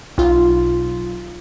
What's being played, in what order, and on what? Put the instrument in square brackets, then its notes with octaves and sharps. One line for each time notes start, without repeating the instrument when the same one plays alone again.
[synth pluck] B1 F4